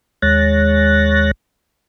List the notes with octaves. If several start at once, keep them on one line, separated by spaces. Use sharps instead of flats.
D#2 G#3 C#5 F#6 A6 A#6